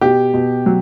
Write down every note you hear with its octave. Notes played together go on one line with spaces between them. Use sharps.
B2 G4
B2
F#3